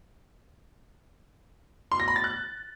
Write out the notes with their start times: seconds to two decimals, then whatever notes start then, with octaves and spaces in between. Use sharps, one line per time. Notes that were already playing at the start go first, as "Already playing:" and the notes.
1.92 C6
2.00 A#6
2.08 B5
2.16 A6
2.24 F#6